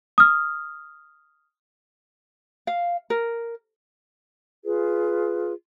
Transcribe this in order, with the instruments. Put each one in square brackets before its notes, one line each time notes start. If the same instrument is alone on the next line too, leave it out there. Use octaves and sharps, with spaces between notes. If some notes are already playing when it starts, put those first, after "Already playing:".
[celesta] D#6 F6
[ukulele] F5
A#4
[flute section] F4 G#4 B4